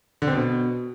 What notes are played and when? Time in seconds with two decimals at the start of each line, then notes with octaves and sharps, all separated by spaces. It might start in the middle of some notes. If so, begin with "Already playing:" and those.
0.22 D3
0.27 C4
0.33 B2